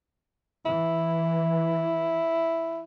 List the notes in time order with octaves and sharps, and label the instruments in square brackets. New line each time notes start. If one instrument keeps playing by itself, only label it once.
[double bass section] E3 [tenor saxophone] E4